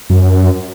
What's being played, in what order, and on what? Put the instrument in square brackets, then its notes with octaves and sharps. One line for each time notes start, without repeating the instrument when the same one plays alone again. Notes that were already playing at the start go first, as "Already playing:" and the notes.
[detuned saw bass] F#2